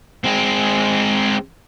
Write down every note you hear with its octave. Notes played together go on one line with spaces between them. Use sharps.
G#3 C4